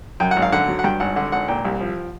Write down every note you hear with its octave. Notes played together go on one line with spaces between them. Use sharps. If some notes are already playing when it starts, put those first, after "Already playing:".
F#2 G5
F#5
G#1
F5
D3 F#5
F#3
F#5
G2 G5
G#1 F#5
D3 F#5
G#1 F#5
A#2 G5
C2
F3